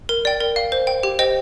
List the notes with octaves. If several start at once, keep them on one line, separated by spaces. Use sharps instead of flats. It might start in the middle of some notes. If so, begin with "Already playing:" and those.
A#4
D5 G5
A#4
F5
C5
G5
G4
C5 D#5 G5